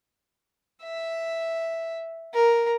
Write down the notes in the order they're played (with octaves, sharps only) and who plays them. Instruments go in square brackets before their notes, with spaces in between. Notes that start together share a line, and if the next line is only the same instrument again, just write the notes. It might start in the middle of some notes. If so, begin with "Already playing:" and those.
[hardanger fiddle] E5
A#4